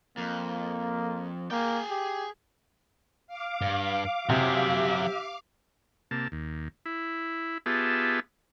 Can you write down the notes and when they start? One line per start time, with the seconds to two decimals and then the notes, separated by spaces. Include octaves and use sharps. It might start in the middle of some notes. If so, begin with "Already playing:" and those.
0.18 F2 A#3
1.51 A#3 G#4 G5
1.90 G4
3.27 F5 D6
3.62 G2
4.29 C3 F#3 G4 G#4 E5
6.11 C3 A#3 A5
6.32 D#2
6.86 E4
7.66 B3 F4 G4 G#4 E5 A5